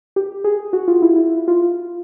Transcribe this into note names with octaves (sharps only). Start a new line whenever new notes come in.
G4
G#4
F#4
F4
E4
E4
F4